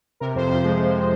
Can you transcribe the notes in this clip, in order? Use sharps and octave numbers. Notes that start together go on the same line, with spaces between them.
C3 A#4
F2 C5
F3 C5
G#3
F3
G#3